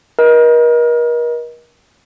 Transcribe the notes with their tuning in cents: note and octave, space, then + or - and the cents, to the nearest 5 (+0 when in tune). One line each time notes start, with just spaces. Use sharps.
A#4 +40 D#5 +15